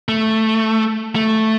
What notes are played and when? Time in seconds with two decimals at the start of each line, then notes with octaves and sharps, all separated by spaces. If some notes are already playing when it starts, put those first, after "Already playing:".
0.09 A3
1.15 A3